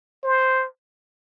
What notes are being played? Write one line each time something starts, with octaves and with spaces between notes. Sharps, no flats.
C5